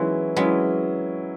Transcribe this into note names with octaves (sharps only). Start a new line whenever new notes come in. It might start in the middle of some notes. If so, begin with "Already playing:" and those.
Already playing: E3 F#3 G#3 C#4 E4
F#3 G#3 B3 C#4 E4